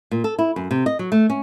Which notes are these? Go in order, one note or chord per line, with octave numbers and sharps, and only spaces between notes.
A#2
A4
E4
F#2
C3
D#5
F#3
A3
C#4